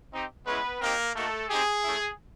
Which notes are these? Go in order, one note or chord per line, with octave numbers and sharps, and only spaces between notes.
C4 D#4 G4
G#3 B3 C#4 E4 B4
A#3 C4 D#4 G4 A#4
A3 A#3 D#4 F#4 A4
C4 D#4 G4 G#4
A3 C#4 E4